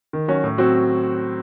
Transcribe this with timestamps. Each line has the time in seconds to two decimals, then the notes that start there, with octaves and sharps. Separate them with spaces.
0.13 D#3
0.28 F#3 C#4 F#4
0.44 A2
0.58 F#3 C4 F#4